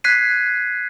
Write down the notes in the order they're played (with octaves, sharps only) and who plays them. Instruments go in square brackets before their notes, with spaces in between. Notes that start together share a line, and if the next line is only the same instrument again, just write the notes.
[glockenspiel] F#6 G#6 B6 C7 D#7